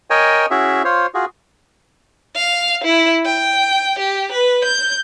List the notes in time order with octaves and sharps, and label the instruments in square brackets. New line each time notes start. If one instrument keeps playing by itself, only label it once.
[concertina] A#4 C#5 D#5 G5 G#5
C#4 E4 F#4 G#4 E5
F4 C5 C#5
F4 F#4 G#4
[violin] F5
E4
G5
G4
B4
G6